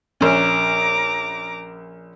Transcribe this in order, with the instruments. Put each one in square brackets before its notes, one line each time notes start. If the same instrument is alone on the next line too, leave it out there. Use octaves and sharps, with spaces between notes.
[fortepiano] A#1 C#4 [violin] A#5 D6